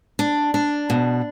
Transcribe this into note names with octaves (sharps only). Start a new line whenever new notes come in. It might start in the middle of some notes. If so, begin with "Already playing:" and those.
D4
D4
B2